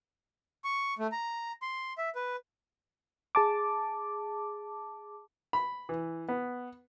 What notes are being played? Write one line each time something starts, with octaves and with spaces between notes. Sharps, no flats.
C#6
A3
A#5
C6
E5
B4
G#4 A5 D6
B5
E3
B3